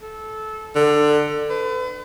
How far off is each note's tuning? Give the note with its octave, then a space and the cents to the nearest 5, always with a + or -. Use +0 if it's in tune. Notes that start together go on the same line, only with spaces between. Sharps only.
A4 -20
D3 +20
B4 +40